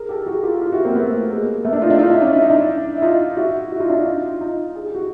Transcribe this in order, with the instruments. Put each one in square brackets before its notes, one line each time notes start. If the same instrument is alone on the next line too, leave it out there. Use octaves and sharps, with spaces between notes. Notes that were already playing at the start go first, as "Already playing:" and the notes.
Already playing: [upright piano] G#4 A#4
G4 A4
F#4 G#4
F4 G4
F4 G4
E4 F#4
A#3 C4
A3 B3
G#3 A#3
A3 B3
D4 E4
D#4 F4
D4 E4
D#4 F4
D4 E4
C#4 D#4
E4
D#4
D4 E4
E4
D#4 F4
E4 F#4
E4 F#4
D#4 F4
D4 E4
D#4 F4
D#4 F4
G#4
G4
F#4